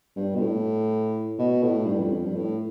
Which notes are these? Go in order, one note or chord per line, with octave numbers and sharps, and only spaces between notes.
G2
B2
A2
B2
A2
G2
F2
F2
G2
A2